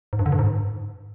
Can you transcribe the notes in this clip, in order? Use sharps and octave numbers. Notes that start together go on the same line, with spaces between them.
G#2
G2
D3
G2
G#2